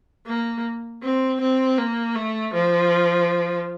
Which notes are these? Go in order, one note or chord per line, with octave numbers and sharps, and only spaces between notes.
A#3
C4
C4
A#3
A3
F3